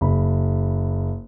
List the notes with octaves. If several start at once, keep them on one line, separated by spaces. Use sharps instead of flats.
F#1 B5